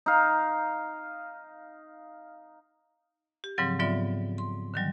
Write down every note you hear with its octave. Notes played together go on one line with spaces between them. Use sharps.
D#4 F5
G4
G#2 C#3 F3 F#3 C4
G#2 F#3 B3 F4 D5 E5
C6
D3 D#3 F#3 G3